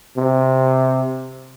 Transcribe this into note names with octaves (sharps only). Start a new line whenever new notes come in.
C3